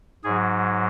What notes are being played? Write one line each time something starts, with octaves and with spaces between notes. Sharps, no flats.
G#2 F#3 G#4